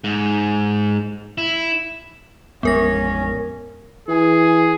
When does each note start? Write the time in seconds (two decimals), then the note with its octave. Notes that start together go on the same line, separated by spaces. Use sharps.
0.04 G#2
1.38 E4
2.63 A1 F2 G#3 B3 C#4 A#4 A#6
4.08 E3 G#4